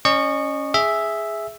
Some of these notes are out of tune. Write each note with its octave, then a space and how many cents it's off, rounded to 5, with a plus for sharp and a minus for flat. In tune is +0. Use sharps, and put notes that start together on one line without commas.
C#4 +0 D#5 -35 C#6 +0
G#4 +0 E5 +0